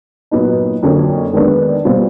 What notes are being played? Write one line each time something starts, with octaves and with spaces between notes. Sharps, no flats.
A#2 F#3 B3 D#4
F2 D3 F#3 A#3 C#4
D#3 G#3 B3 D4
B2 G3 C4 F4